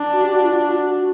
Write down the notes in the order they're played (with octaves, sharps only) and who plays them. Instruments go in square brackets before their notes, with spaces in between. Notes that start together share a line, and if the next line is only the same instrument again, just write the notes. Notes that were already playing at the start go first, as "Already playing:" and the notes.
Already playing: [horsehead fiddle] D4
[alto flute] F#4
G4
F#4
F4
F#4
F4
F#4